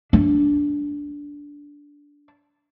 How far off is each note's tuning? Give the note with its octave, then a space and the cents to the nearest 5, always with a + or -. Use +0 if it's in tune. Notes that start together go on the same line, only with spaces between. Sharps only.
D4 -15